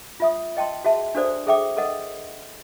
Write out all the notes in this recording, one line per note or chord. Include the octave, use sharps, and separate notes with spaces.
F4 E5 D#6
D#5 G5 A5 C6
F#4 G#4 E5 A5
D4 F#4 A4 C5 D5
G#4 A4 E5 G5 D6
A4 A#4 D#5 F#5